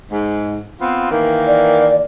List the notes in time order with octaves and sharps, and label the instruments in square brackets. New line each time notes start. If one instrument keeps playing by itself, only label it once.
[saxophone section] G#2
B3 C4 F4
D#3 E3 A#3
[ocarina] D5